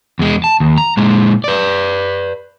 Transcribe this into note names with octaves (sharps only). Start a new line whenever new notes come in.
E2 G#3
A5
D#2
A#5
A#2 G#3
B4 D5